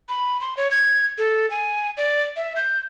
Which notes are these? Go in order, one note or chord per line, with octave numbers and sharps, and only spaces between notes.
B5
C6
C#5
G#6
A4
G#5
D5
E5
G6